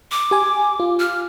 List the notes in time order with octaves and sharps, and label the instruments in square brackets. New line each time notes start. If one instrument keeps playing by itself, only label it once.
[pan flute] D6
[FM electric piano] G4 G#5
F4
[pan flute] F6